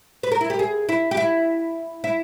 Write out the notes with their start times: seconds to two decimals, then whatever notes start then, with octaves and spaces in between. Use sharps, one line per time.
0.23 B4
0.31 A#4
0.41 E4
0.50 G4
0.59 G#4
0.89 E4
1.11 G4
1.17 E4
2.04 E4